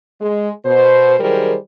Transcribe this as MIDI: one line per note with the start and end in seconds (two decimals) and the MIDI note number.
0.21 0.51 56
0.65 1.17 47
0.65 1.17 72
1.20 1.56 51
1.20 1.56 54
1.20 1.56 55
1.20 1.56 68
1.20 1.56 70
1.20 1.56 72